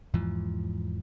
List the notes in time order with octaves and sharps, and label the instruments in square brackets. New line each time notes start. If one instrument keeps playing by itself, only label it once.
[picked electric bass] E2 G#2 E3 F3